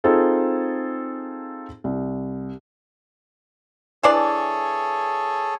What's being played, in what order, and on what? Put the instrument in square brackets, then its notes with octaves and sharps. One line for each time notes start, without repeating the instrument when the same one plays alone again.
[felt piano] C4 D#4 F4 G#4 A4
C2
[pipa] E3 D4 D5 [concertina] G#4 A4 C#5